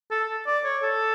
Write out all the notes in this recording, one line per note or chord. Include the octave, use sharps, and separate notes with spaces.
A4
D5
C#5
A4